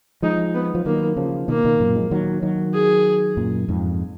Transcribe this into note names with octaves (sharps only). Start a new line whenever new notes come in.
F3 G#3 D#4
B3
F3
D#3 F#3 A#3
C#3 F3
B2 D#3 A#3
B2 D#3
F#2 A#2
F3 G#3
D#3 F#3
D#3 F#3
G#4
F#2 A#2
F2 G#2